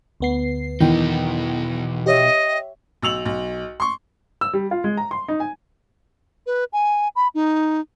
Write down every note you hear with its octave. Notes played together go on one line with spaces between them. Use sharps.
D2 B3 C7
E2 B2 D#3 D#4 G5
G4 C#5 D#5 E5
B1 E6 F7 F#7
B1
C6 C#6
E6
G3
F4
G#3
A#5
C6
D#4
G#5
B4
G#5
B5
D#4